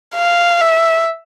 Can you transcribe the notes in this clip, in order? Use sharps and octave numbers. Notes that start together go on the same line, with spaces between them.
F5
E5